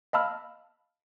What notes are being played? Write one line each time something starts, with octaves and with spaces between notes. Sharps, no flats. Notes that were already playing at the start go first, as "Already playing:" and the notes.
D#5 F5 A5 B5 E6 F6